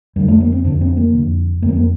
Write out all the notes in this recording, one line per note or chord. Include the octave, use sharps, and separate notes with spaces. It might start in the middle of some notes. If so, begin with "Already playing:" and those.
F2 D3 G3
A3
A#3
C4
F2 D3 D4
C4
A#3
F2 D3
F2 D3 A#3
C4
A#3